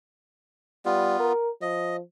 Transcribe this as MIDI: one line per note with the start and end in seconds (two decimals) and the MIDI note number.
0.86 1.19 55
0.86 1.33 59
0.86 1.33 65
1.19 1.50 70
1.62 2.00 53
1.62 1.96 75